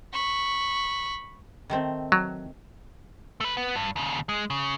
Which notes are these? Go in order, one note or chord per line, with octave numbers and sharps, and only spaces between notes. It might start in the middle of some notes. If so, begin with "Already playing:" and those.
B5 C#6
D#3 A3 C4
F#3
A3 B4
B3
G2
D#2 C#3
G#3
C#3